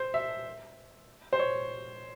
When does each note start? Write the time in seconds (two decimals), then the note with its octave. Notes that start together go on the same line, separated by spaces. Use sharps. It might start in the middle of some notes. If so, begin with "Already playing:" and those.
Already playing: C5
0.14 E5
1.33 C5
1.39 C#5